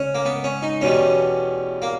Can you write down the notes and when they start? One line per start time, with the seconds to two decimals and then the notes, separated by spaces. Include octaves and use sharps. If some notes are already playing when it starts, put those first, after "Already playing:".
Already playing: C#3 G#3 C#4
0.15 A#3
0.25 B3
0.44 C#4
0.62 D#4
0.81 E2 B2 G3 C#4
1.82 A#3